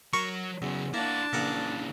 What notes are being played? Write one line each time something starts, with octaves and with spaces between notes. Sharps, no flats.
F#3 A#4 C#6
E2 C#3 F#3
A#3 D4 E4 F#4 A5
A#1 C#3 E3 A#4 F#5